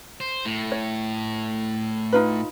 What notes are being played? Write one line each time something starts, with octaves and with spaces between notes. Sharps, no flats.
C5
A2
C#5
D#4 F4 B4